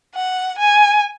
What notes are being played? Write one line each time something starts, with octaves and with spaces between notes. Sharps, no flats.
F#5
G#5